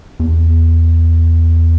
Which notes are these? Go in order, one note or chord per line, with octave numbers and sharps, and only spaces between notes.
E2